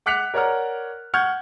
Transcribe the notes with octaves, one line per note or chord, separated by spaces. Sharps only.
F#5 D6 F#6 B6 C#7 F7
A#4 C#5 D5 F#5 A#5 F6
F#5 C#6 F6 G6 G#6